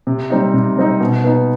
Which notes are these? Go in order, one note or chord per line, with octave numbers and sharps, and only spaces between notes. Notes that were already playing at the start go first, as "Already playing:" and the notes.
C3
G3 C4 D#4
C3
G3 C4 D#4
B2
B3 D#4